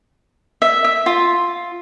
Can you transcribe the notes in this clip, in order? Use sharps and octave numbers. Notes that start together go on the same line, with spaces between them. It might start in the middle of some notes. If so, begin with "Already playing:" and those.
E5
E5
F4